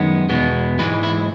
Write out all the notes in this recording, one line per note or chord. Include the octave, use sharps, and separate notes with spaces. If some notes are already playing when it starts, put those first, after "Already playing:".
Already playing: F#2 D#3 G#3 B3
E2 B2 G#3 B3
G#2 E3 G#3 B4
E4